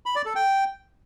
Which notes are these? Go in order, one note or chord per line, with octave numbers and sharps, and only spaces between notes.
B5
D5
A4
G5